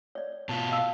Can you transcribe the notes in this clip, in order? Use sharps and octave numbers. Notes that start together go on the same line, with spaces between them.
C#5 D5
B2 F4 A5
F5 E6